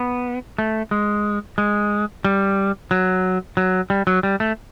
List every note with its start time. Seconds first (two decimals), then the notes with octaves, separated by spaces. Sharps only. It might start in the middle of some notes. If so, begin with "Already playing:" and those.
Already playing: B3
0.58 A3
0.91 G#3
1.58 G#3
2.25 G3
2.91 F#3
3.57 F#3
3.90 G3
4.07 F#3
4.23 G3
4.40 A3